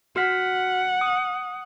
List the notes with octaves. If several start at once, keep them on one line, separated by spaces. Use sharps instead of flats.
F#4 F#5 F6 B6
D#6